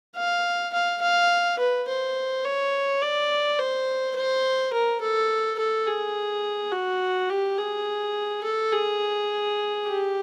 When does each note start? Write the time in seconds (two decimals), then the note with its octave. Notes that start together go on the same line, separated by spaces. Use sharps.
0.17 F5
0.74 F5
1.02 F5
1.59 B4
1.88 C5
2.45 C#5
3.02 D5
3.59 C5
4.16 C5
4.73 A#4
5.01 A4
5.59 A4
5.87 G#4
6.73 F#4
7.30 G4
7.59 G#4
8.44 A4
8.73 G#4
9.86 G4